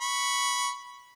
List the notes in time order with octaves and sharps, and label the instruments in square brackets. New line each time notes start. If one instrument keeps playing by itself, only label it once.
[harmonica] B5 C#6